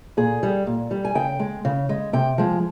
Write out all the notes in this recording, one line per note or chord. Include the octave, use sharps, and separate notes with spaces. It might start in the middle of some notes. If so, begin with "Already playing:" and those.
A#2 G#4
G3
A#2
G3
G#5
C#3 G5
G#3
C#3
G#3
C3 G5
F3 G#3